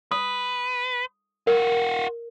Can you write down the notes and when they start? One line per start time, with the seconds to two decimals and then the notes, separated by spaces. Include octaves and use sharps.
0.12 B4 D#6
1.47 F4 F#4 A#4